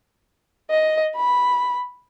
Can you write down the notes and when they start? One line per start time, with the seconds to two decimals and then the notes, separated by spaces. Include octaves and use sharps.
0.70 D#5
1.16 B5